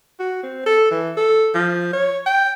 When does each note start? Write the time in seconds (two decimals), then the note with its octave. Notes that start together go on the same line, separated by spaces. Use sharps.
0.20 F#4
0.43 C4
0.66 A4
0.91 E3
1.17 A4
1.54 F3
1.93 C#5
2.26 G5